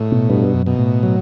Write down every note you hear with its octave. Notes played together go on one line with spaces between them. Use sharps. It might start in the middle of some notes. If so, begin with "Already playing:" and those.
Already playing: A2
B2
G2 B2
F#2
B2
A2
F#3